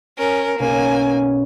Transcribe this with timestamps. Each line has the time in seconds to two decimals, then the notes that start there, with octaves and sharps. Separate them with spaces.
0.18 C#4 A#4
0.59 B1 A#3 C#4 G#5